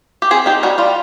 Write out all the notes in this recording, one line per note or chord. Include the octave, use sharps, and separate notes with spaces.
G4
C4 G#4
D#4 G4
G3 F#4
G3 F4